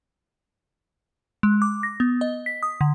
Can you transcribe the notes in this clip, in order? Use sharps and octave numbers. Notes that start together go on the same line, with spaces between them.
G#3
D6
A#6
B3
D#5
B6
D#6
D3